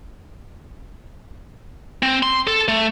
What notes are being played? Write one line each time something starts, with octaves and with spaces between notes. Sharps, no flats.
C4
C6
A4
A3